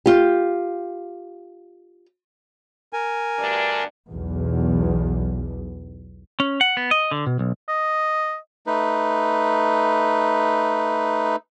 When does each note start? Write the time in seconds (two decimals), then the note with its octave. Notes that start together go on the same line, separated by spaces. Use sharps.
0.06 F4 G4
2.93 A#4 G#5
3.39 D2 G2 D4
4.10 B1 E2
6.40 C#4
6.61 F#5
6.77 B3
6.91 D#5
7.11 D3
7.26 B2
7.39 B1
7.68 D#5
8.67 A3 D#4 B4